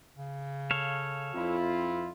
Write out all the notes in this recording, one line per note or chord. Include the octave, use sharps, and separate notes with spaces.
C#3
A4 C#5 F5
F2 C4 E4 F4